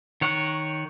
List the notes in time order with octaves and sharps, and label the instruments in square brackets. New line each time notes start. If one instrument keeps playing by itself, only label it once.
[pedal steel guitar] D#3 C#5 F#5